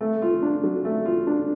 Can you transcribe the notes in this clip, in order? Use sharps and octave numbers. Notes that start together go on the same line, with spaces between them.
A3
F4
D4
F#3
A3
F4
D4